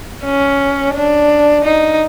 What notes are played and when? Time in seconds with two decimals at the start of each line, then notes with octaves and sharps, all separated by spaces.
0.24 C#4
0.94 D4
1.64 D#4